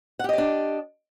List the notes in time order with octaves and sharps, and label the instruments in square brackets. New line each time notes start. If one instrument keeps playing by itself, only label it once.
[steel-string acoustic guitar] F#5
G4
D#5
D5
D4